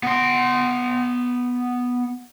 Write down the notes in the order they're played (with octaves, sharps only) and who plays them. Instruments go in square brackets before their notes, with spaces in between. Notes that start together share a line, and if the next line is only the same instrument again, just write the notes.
[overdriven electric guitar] B3 C6